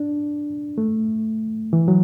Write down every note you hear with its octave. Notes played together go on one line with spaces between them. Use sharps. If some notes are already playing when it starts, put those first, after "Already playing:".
Already playing: D4
A3
E3
F#3